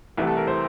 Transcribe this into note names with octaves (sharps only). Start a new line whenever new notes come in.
C2 C3 E3 A3
A4
A#4
C5